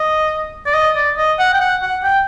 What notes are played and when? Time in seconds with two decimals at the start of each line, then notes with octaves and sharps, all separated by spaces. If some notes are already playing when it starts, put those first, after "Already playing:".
Already playing: D#5
0.66 D5
0.74 D#5
0.96 D5
1.17 D#5
1.39 F#5
1.53 G5
1.61 F#5
1.82 F#5
2.04 G5